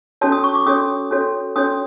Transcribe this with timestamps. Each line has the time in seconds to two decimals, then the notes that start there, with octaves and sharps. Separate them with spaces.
0.21 C#4 F#4 A4 C#5 A5
0.32 D#6
0.44 C#6
0.55 D6
0.66 C#4 F#4 A4 C#5 D#6
1.11 C#4 F#4 A4 C#5
1.56 C#4 F#4 A4 C#5 D#6